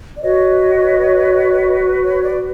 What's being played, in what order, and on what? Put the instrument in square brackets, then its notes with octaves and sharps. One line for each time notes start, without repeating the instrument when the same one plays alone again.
[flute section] D5
F#4 B4 C#5 D#5
C#5
D5